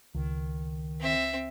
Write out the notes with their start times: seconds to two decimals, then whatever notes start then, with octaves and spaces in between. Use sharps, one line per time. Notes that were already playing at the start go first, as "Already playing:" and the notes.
0.15 C#2 D#3
1.00 C4 E5